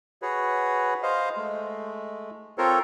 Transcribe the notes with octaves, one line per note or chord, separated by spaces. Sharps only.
F#4 G#4 B4 C#5
C5 D#5 F5
G#3 A3
C4 F4 A4 A#4 C5 C#5